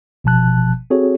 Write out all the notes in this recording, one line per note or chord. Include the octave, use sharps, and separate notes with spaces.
G1 B2 F3 A5 F#6
C4 F#4 G#4 A4 C#5